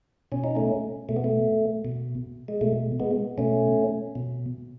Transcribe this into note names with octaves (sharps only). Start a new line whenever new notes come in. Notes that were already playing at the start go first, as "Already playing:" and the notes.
B2 C#4
D#4
A3 C#4
B2 A3
B3
A3
B2
G#3
B2 A3
G#3 B3
B2 A3 C#4
B2